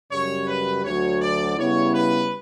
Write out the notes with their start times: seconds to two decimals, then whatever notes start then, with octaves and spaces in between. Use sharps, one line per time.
0.10 F#2 C#3 G3 C#5
0.47 B4
0.83 D2 D3 F#3 C#5
1.20 D5
1.57 C#3 G3 B3 E4 C#5
1.94 B4